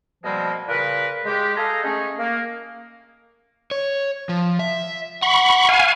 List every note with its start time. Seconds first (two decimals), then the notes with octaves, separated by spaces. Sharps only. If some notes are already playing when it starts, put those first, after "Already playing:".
0.23 B2 F3 G3 G#3 A#3 C4
0.68 A#2 C#3 A#4 B4
1.25 G#3 G4
1.56 A4 D#5 F5 G#5 A#5
1.83 G#3 A3 C#4 D#4 G#4
2.18 A#3
3.71 C#5
4.29 F3
4.59 E5
5.22 F#5 B5 C#6
5.69 F5 G#5